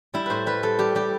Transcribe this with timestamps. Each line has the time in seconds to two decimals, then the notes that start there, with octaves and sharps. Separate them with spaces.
0.14 G3 E4
0.26 A2 B4 C5
0.46 G3 B4
0.63 G3 A4
0.79 G3 G4
0.95 G3 G4